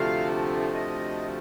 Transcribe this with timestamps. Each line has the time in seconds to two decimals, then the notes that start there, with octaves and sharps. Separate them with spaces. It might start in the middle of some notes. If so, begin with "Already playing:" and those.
Already playing: D2 C3 F3 A3 F5
0.74 D#5